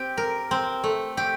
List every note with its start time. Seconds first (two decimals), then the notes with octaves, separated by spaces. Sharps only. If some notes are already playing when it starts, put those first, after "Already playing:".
Already playing: C4 G4
0.17 A#4
0.51 C4
0.84 A3
1.17 G4